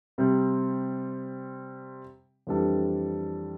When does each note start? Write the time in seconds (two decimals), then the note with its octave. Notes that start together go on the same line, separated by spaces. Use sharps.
0.18 C3 G3 C4
2.47 F2 E3 G3 D4 A4